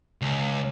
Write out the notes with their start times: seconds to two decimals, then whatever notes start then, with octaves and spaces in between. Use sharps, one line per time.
0.22 C#2